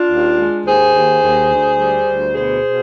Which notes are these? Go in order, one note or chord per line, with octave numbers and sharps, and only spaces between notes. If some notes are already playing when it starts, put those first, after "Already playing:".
Already playing: D4 F4
D#2
G#3
D#2 G#4 C5
D#2
D#2
D2
G3
D2
B2 G#4 C5
B2